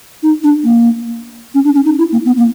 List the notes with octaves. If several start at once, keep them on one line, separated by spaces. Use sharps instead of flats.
D#4
D4
A#3
C#4
D4
C#4
D#4
E4
A#3
B3
A#3